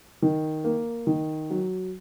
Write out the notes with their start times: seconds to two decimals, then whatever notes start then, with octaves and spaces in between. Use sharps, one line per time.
0.22 D#3
0.64 A#3
1.07 D#3
1.50 F#3